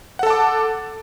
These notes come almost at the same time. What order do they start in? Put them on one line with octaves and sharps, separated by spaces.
F#5 A4 A5 D6